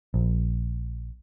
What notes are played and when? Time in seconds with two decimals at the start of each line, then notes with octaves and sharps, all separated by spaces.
0.14 A#1